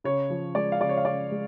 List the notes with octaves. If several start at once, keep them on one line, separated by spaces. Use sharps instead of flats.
C#3 C#5
F3
G#3 D5
F5
C#3 D5
C#5
F5
C#3 D5
G#3